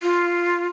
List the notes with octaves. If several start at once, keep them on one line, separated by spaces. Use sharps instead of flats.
F4